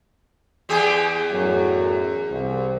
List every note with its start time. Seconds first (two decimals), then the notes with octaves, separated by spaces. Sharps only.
0.69 E2 G4 G#4
1.32 F#2 A2 F#3
2.31 C2